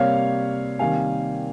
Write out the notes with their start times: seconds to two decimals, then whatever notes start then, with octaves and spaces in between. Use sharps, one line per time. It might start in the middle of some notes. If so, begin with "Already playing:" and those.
Already playing: C3 G3 A#3 C#5 F5
0.79 C3 D#3 G3 A#3 F5 G#5